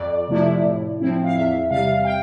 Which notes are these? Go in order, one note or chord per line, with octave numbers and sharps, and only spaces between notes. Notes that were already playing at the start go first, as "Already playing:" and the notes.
Already playing: F2 D5
C3 F3 A3 E4
A2
F3 C4 E4
F5
E2 E5
C3 G3 F5
G5